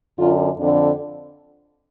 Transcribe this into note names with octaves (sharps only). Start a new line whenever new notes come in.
F#2 D3 F4
F2 D3 D4